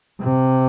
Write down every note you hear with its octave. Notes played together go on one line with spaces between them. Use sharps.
C3